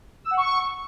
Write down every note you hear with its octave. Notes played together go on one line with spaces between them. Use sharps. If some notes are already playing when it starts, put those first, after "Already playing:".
E6
F#5
C#6